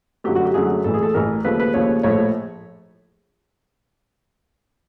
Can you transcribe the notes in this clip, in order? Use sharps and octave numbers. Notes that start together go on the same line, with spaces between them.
F#2 D3 F#3 A3 G4
F#4
G4
F#2 D3 F#3 A3 G#4
A1 A2 E3 A4
G#4
A4
A1 A2 E3 A#4
D#2 C#3 F3 A3 B4
B4
D#2 C#3 F3 A3 C#5
A#1 A2 F3 A3 C#5